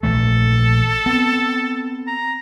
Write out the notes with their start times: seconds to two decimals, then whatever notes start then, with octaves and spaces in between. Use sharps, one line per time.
0.03 A#1 E3 A3 A4
1.06 B3 C4
2.07 A#5